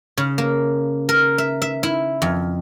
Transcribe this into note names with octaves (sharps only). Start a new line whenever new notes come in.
C#3
A#3
A#4
E5
E5
E4
F2